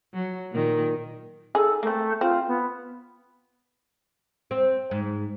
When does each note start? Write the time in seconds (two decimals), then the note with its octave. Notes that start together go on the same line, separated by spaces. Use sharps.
0.14 F#3
0.51 A#2 D#3
1.55 D#4 G#4 A4
1.83 A3 A#3 C4
2.21 C4 F4
2.47 B3
4.51 C4
4.91 G#2